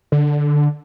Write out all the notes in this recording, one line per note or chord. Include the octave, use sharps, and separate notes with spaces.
D3